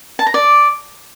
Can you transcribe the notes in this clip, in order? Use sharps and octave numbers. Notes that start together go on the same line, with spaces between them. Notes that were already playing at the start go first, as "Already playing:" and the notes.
A5
A#5
D5